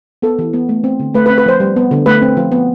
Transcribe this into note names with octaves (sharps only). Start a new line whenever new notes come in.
B3 A4
E3
B3
A3
C4
D3
A3 B4
B4
C4
B4
F3 C5
G3
B3
D3
A3 B4
C4
F3
B3